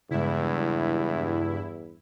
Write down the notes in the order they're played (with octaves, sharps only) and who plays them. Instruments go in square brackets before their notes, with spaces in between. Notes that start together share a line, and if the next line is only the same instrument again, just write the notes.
[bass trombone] E2 [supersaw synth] G2 E4 [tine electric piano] C#3 G#3